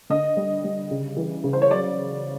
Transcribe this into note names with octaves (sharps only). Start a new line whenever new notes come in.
D3 D#5
G3
G3
C#3
E3
C#3
C5
C#5
F#3 D5